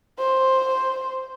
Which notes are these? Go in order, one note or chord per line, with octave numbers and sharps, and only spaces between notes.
C5